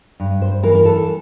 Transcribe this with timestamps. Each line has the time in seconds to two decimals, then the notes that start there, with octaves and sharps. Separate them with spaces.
0.20 G2
0.42 C5
0.63 E3 A#4
0.75 A#4
0.85 A4